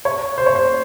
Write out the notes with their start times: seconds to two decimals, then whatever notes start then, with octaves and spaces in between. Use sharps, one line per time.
0.05 C#5
0.38 C5
0.46 C#5
0.55 C5